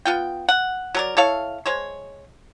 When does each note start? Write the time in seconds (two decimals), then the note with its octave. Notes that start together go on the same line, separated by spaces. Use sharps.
0.05 B3 F4 G5
0.49 F#5
0.95 F#3 A#4 D5
1.17 E4 A4 C#5 F5
1.66 G#3 C5 C#5